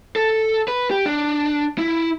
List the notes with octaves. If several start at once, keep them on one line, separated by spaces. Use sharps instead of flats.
A4
B4
G4
D4
E4